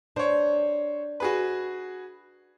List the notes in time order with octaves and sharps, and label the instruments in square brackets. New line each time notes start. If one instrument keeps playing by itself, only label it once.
[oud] D4 [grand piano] C5 C#5
[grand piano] F#4 G#4 B4